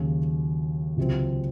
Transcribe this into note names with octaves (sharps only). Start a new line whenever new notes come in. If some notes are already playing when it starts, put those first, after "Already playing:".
Already playing: D#2 C#3 F#3
C#2 C3 F#3 C4